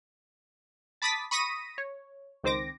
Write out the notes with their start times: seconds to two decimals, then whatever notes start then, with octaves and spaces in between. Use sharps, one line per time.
1.02 A5 B5 D6 D#6 A6 B6
1.31 B5 C#6 D#6 A#6 B6 D#7
1.78 C#5
2.43 C#2 D#3 C4 C5 D6 A#6